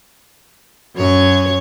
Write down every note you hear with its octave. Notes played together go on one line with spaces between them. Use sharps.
F#2 C#5